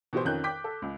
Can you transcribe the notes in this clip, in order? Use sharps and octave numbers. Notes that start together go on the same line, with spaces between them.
B2 E3 G4 C5
F2 D#3 C#4 D#4 F#6 G6
G5 D6 G6 B6
A4
C#2